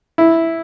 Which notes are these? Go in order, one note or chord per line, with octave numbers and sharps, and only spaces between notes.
E4